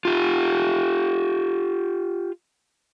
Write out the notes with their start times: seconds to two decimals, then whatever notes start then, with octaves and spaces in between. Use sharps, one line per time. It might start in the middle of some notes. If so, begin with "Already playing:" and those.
0.05 F4 G4